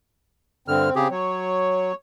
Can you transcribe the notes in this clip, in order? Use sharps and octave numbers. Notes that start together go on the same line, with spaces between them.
G2 D3 C4 F6
C#3 C4 G4 G#4
F#3 C#5